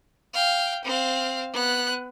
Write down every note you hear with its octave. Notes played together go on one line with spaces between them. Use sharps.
F5 G5
C4 F5
B3 F#6